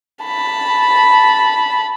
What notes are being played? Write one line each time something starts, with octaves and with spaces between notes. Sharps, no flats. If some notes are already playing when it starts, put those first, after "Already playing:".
A5 B5